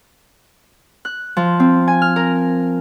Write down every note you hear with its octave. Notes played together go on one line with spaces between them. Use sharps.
F#6
F3
C4
G#5
F6
A#4